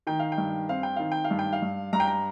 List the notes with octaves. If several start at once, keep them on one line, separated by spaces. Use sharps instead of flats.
D#3 G5
F5
G5
G2
C4 F5
G5
D#3 F5
G5
F5
G2
G5
F5
G2
G2 A#5
G5
A#5